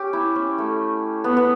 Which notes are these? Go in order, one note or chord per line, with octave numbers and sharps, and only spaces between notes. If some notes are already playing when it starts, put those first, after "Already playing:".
Already playing: C#4 G4
E4
C#4
A3
B3
B3